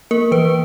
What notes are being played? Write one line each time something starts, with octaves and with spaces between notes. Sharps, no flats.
A#3 A#4
E3 B4